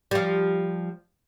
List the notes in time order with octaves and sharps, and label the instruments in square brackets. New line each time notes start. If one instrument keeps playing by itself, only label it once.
[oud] F3 G3